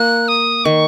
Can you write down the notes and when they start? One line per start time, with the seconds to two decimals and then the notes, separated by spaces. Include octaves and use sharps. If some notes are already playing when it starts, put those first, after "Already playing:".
Already playing: A#3 F#6
0.28 D#6
0.65 D#3 C#6